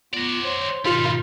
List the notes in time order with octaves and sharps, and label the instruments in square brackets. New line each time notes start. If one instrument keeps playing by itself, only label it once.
[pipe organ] B3 F4 [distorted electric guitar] F#4 D5
[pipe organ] C5 C#5 C6
[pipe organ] G#2 B2 D#3 [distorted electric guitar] G3 D#4 [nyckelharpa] F4